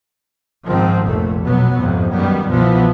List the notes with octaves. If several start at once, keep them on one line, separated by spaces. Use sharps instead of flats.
G#2 D#3 F3 C4
F1 A#1 A#2 A3
B2 F#3 B3
F2 G#2 C3
F#2 D#3 G3 B3
C2 B2 E3 F3 B3